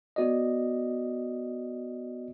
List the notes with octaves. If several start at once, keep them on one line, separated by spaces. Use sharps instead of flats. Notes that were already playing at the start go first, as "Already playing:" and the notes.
B3 F#4 D5 D#5